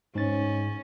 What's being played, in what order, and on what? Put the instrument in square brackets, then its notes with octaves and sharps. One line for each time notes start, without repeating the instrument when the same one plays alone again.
[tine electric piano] G#2 A6 [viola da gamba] C#4